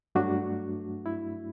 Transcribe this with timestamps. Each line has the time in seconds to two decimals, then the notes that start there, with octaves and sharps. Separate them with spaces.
0.15 G2 F#3 A3 D4 F#4
1.06 E4